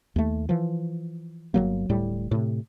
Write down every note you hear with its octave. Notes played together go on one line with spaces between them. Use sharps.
D#2 A3
E3 F3
G1 E2 F#3 A#3
D1 A2 G3
A2 C3